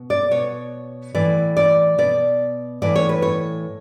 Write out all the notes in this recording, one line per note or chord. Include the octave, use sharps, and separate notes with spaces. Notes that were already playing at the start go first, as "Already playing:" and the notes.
Already playing: B2
D5
B2 C#5
A2 E3 D5
D5
B2 D5
A2 E3 D5
C#5
B4
C#5